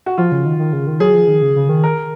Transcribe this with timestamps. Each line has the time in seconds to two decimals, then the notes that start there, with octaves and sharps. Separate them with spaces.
0.06 F#4
0.18 F3 F4
0.32 C#3
0.46 D#3
0.59 D#3
0.73 C#3
0.87 D#3
1.00 F#3 G#4
1.14 F3
1.28 D#3
1.42 C#3
1.56 C#3
1.69 D#3
1.84 A#4